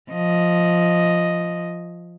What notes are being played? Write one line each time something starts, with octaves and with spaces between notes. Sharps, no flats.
F3 D#5